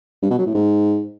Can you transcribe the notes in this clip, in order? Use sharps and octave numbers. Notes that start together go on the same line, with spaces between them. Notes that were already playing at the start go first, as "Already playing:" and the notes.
G2
B2
F#3
A2
G#2